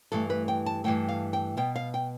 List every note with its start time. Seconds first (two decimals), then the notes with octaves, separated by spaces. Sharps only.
0.12 G2 E3 A3 A4
0.30 B4
0.48 G5
0.66 A5
0.84 G2 E3 A3 G5
1.09 F5
1.33 G5
1.57 B2 B3 G5
1.76 F5
1.94 G5